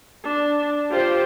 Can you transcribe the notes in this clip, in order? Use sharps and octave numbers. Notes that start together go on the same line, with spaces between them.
D4
F4 G4 C5